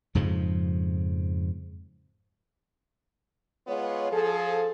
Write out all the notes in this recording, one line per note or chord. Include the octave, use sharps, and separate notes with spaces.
F2 G#2 C#3 F3
G#3 B3 F4 C#5
F3 G#4 A4